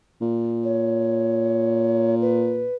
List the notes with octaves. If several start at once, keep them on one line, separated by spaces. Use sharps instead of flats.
A#2
C#5
B4